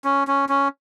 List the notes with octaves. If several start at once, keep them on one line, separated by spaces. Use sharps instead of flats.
C#4
C#4
C#4